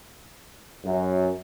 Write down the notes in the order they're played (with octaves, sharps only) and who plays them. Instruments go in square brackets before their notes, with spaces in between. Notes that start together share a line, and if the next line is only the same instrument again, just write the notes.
[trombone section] F#2